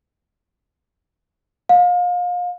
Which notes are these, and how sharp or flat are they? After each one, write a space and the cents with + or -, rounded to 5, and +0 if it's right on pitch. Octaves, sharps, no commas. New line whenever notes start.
F5 +30